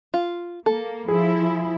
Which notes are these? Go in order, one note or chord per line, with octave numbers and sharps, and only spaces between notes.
F4
A#3 A4
F3 E4 G#4